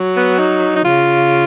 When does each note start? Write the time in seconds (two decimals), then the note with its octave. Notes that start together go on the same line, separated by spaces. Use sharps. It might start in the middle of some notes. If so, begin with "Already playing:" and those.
Already playing: F#3
0.16 B3
0.39 D#4
0.76 D#4
0.85 C#3 F4